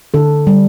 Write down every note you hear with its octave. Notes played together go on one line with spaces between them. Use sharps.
D3 A4
G3